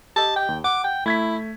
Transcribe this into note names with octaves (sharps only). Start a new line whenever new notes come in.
G4 D#5 A5
G5
D#2
F#5 D6
G5
A3 E4 G#6 B6